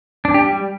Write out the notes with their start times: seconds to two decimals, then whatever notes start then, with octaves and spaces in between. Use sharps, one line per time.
0.25 D4
0.34 G4
0.44 G3